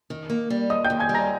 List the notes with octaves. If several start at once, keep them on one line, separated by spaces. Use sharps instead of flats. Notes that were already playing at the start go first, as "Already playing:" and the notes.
D#3
A#3
G3
D#2 D#5 D#6
G5 G6
D#2
G#5 G#6
G3
A#5 A#6